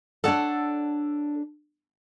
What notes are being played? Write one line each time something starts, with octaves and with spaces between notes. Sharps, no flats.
D4 A4 C#5 D5 F#5